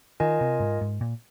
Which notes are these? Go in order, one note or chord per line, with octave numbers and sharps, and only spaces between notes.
D#3 F4 A#4 D#5 G#5
C3
G#2
G#2
A#2